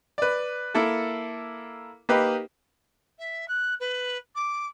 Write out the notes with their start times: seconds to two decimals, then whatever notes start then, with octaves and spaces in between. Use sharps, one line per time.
0.18 B4 D5
0.74 A#3 E4 A4
2.09 A#3 D#4 G4 B4
3.18 E5
3.48 F#6
3.80 B4
4.35 D6